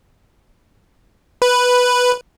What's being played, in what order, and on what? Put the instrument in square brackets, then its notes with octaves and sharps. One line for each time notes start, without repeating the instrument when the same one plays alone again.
[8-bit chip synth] B4